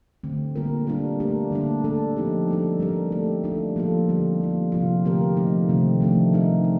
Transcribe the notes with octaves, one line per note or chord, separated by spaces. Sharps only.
D3 A3 C4
D3 G3 A#3 F4 A#4
G3 D4 F4 A#4
A3 D4 G4 A#4
D3 G3 A#3 D4
A3 D4 A4
F3 C4 D#4 G4
G3 D4 A4
G3 C4 G4 A#4
A3 D#4 A4
G3 D4 F4 A4
F3 A#3 F4 A4
D3 G3 C4 D#4 G4
F3 A#3 F4
C3 F3 C4 F4
D3 A3 C4 G4 A#4
F3 A3 D#4
C3 D#3 A3 C4
F3 A3 D4 A4
G3 C4 D#4 A#4
A#4